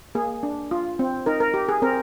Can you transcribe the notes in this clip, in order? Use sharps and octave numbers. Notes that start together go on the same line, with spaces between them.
A#3 G#4
D4
F4
C4
D#4 A#4
A#4
G4
G#4
C4 A#4